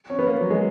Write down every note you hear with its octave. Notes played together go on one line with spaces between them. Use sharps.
C#4
B3
A#3
F#3
G#3